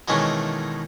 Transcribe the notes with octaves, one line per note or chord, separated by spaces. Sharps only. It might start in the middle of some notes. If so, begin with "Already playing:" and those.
B2 D#3 E3 G#3 A3 C#4